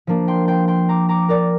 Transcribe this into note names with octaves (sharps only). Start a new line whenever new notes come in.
F3 A#3 D4
G5 C6
G5 C6
G5 C6
A#5 D6
A#5 D6
A#4 D5